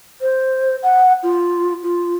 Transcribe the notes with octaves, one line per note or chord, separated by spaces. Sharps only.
C5
F#5
F4
F4